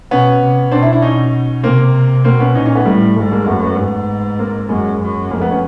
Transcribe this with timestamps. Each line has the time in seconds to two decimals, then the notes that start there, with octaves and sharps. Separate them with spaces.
0.11 B2 B3 C#4
0.41 C3
0.71 B2 C4 D4
0.82 D4 E4
0.93 D4 E4
1.02 C#4 D#4
1.63 C3 A#3 C4
2.24 B2 A#3 C4
2.40 B3 C#4
2.55 A#2 C#4 D#4
2.66 C#4 D#4
2.75 A3 B3
2.86 A2 G3 A3
3.16 G#2 G3 A3
3.32 G#3 A#3
3.47 F#2 A3 B3
3.62 A3 B3
3.78 G#2
4.39 A#3 C4
4.69 F#2 G#3 A#3
5.01 F#2
5.31 F2 G#3 A#3
5.41 A3 B3
5.51 B3 C#4